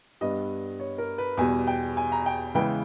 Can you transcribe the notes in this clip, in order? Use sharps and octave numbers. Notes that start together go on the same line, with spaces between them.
G2 G3 B3 D#5
C#5
A#4
B4
E2 B2 G3 G#5
G5
G#5
A#5
G5
C#3 E3 G#3 B3 G5